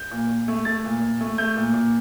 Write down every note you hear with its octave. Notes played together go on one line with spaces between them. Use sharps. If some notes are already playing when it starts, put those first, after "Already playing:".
Already playing: G6
A#2
A#2
A3
A3 A6
A#2
A#2
A3
A3 G6
A#2
A#2